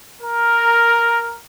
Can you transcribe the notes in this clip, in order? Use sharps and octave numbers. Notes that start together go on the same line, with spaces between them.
A#4